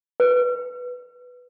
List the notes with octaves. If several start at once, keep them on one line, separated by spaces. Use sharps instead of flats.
B4